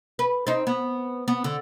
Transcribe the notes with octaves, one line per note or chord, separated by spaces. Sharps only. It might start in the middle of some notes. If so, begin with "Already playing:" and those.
B4
C4 D#4
B3
B3
D3